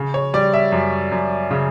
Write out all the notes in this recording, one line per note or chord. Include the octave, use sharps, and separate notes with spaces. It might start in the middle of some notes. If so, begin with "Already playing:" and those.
Already playing: C#3
C#5
G3 D5
E5
F#2
F#2
C#3